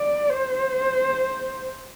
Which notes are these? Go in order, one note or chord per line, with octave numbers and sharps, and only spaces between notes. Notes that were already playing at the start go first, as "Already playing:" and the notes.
Already playing: D5
C5